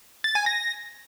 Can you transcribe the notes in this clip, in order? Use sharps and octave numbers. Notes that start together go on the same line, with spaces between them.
A6
G#5
A#6